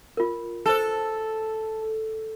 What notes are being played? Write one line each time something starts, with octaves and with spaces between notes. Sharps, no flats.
F4 A#4
A4 C5 A5